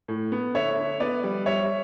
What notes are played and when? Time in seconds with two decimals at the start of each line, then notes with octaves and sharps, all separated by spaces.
0.08 A2
0.32 B3
0.55 D3 C#5 E5
0.77 D3
1.00 B3 B4 D5
1.23 G3
1.46 G3 C#5 E5